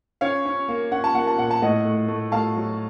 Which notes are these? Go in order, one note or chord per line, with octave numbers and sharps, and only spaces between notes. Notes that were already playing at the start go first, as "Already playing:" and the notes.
C#4 C#5 F5
C#4
A#3
C#4 F#5
A5
A#3 F#5
A5
A#2 F#5
A5
A2 D#5 F#5
A3
A3
A3 F5 A5
F#3